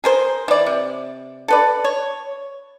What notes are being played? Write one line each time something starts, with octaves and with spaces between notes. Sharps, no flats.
G#4 A#4 C5
E3 D5
C3
A4 B4 D5
C#5